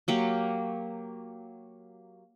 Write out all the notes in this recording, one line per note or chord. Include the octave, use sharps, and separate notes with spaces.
F#3 A#3 G4